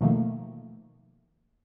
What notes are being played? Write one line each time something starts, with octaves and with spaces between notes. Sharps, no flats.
B2 D#3 F3 A3 A#3